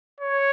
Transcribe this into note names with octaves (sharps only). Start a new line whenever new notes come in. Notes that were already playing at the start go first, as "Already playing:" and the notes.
C#5